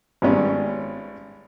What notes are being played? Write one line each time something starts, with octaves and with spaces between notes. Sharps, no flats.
G#1 G#2 G3 B3 C#4